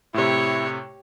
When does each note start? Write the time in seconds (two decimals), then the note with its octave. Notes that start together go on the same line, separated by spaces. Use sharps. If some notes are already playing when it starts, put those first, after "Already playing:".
0.14 A2 C3 E4 G4 C#5